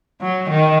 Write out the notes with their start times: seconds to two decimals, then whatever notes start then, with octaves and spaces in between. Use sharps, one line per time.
0.21 F#3
0.50 D#3